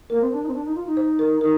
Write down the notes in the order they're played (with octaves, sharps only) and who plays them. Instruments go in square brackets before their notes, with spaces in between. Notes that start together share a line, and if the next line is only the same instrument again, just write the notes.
[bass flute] A#3 [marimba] A#4
[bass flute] C4
D4
D#4
C4
D4
D#4
F4
D#4
[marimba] C5
A#4
[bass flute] D#4 [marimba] A#4